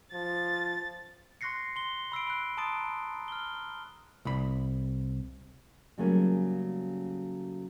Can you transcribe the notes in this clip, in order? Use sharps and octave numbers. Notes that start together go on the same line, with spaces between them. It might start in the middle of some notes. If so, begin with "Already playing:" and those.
F3 A6
C6 C#6 F#6 A#6 C7 C#7
C6 G7
B5 E6 C7 D7
B5 F#6
A5 A#5 C6 D#6 A6 D7
F6 G7
C2 B5
C#3 F#3 G3 A3 A#3 C#4